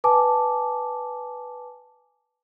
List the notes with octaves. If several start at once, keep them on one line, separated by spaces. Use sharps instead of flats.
B4 G#5 A5 D6